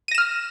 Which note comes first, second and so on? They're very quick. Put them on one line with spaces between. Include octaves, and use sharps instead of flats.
D#7 A#6 E7 F6